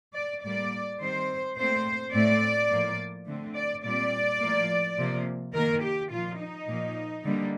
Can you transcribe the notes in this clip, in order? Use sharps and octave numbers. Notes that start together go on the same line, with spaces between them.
D5
A2 G3 A#3 D5
D#3 G3 C4 C5
A#2 A3 C4 C5
A2 A3 C4 D5
A2 F3 A#3
D3 A3 C4
D5
A#2 G3 C4 D5
A2 F3 A#3
C3 F3 A#3
D#3 A#3 A#4
G4
A#2 F3 A#3 F4
D#4
A#2 F3 A#3
D3 G3 A#3